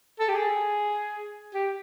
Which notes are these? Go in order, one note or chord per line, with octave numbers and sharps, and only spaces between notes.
A4
G4
G#4
G4